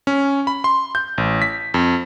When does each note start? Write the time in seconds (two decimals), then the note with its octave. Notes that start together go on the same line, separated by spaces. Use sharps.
0.07 C#4
0.47 B5
0.64 C6
0.95 G6
1.18 A1
1.42 B6
1.74 F2